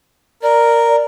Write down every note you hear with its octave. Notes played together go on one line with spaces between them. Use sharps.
A#4 D5